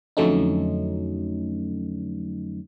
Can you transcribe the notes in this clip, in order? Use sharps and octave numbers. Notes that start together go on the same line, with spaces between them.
F2 D3 F#3 A3 C#4 D#4